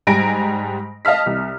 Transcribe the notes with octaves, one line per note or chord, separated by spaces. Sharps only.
G#2 G3 G#5 A#5 A#6 D7
D#5 F5 A5 F6 B6
C2